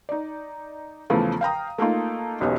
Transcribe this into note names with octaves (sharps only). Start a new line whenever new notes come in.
D#4 D5
E2 C#3 E3 F3 A3
F5 G5 A#5 D#6
A3 A#3 D#4 F4
E1 B1 C#4 G4 D#5